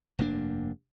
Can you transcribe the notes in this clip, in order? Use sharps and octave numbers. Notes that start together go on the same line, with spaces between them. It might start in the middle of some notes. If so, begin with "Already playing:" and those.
F1 G2 A#3 D4